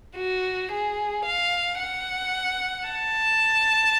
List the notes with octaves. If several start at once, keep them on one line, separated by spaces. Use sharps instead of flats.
F#4
G#4
F5
F#5
A5